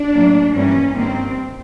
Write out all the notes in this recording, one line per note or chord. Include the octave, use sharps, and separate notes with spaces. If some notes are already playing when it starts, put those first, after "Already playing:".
Already playing: D4
A2 F#3 A#3
G2 E3 G3 A#3 C#4
G2 D#3 G3 A#3 C4